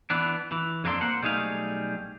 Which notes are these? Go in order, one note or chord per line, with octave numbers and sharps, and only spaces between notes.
E3 B3 D4
E3
F2 G#3 A#3 D4 A4 C6
A#3 C5 F#5
B1 G3 A3 D#4 G#4 F5